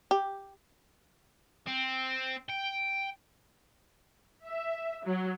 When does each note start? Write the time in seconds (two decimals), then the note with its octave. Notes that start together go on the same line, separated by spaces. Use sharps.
0.11 G4
1.68 C4
2.50 G5
4.46 E5
5.05 F#3